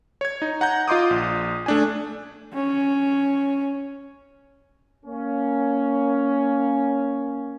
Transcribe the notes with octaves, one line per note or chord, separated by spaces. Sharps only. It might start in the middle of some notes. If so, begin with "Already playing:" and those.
C#5 G#6
D#4
F#5 A#5 G6
F4 D#5 C6 D6 D#6
A#1
A3 D4 G#5
C#4
A#3 C#4